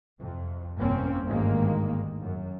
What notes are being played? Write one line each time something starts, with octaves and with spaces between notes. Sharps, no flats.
F2 C3
G1 C2 A#3 C4 C#4
G#1 D2 G2 D#3 G#3 A#3
F#2